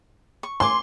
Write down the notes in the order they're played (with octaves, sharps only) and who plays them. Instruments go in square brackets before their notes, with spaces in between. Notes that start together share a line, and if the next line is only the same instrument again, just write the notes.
[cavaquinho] C#6
[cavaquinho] G#5 D6 [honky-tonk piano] C6